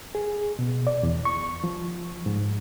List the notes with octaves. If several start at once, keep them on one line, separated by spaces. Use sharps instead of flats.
G#4
B2
D5
E2
C#6
F3
G#2